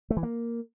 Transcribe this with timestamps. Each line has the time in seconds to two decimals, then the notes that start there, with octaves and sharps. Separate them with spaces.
0.10 A3
0.17 E3
0.23 A#3